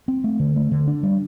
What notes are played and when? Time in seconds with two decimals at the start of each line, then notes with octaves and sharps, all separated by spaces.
0.08 C4
0.24 A3
0.40 D3
0.56 A3
0.72 D3
0.87 D4
1.03 G3